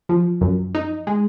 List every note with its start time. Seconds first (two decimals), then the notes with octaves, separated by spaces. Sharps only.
0.09 F3
0.41 F#2
0.75 D#4
1.07 G#3